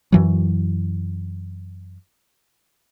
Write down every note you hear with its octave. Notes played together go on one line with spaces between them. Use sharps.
F#2 E3 F#3